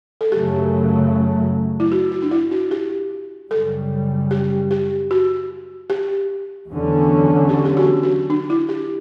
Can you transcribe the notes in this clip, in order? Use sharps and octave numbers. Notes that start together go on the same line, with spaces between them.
A4
F#2 C#3 F#3 A3 G4
E4
F#4
F#4
D4
E4
F#4
G4
F#2 C#3 G3 A4
G4
G4
F#4
G4
E2 D3 F#3 C#4
G4
G4
F#4
F#4
D4
E4
G4